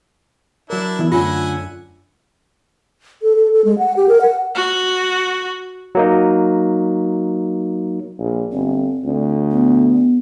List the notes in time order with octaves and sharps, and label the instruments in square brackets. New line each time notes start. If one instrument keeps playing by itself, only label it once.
[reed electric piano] F#3 A#4 [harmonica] D4 E4
[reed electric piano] E3 B3 E4
[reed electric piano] F#2 [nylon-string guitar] D3 A3 C#4 [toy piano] F4 [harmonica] E5 F#5 G#5
[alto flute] A4
A4
A4
G#3
F#5
G4
A#4
F#5
[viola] F#4
[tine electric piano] F#3 A#3 D#4
[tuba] A#1
[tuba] G1 [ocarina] C4
[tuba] D2
[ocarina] B3